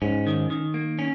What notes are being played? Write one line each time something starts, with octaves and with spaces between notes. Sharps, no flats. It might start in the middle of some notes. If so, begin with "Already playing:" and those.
G#2 C#4
D#3
D#3
A#3
C#4